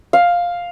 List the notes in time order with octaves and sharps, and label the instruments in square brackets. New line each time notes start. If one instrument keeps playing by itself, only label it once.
[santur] F5